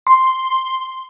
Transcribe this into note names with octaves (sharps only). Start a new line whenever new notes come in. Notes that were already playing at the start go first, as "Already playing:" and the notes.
C6